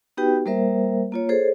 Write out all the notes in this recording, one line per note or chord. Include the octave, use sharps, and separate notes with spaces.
B3 D#4 F#4 G4 B4 G5
G3 A#3 A#4 C5 E5
A#3 F4 C#5
G#4 A4 C5 C#5